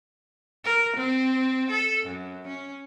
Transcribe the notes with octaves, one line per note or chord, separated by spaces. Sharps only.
A#4
C4
A4
F#2
C#4